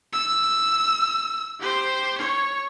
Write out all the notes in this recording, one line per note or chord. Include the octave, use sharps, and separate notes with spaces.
E6
G4 C5
C#5